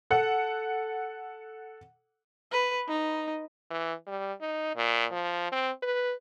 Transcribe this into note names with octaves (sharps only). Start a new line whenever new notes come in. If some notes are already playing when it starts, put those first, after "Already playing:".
A4 F#5
B4
D#4
E3
G3
D#4
A#2
F3
C4
B4